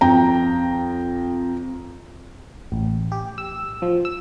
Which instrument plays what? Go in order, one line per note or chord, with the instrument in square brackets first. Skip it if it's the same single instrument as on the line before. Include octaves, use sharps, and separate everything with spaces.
[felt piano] F2 G5 A#5
[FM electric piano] A1
G4
E6
F3
E6